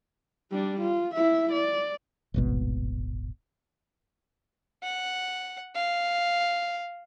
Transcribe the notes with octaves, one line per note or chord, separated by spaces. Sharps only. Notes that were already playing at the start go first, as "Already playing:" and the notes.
G3 D4
F4
E4 E5
D5
D#1 G#1 B2
F#5
F5